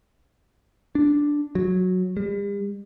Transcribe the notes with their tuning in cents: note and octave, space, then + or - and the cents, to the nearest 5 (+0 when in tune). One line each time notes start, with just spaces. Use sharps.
D4 -5
F#3 -10
G3 +45